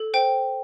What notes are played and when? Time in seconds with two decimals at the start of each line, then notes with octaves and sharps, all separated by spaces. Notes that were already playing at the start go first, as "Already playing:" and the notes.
Already playing: A4
0.14 C5 G5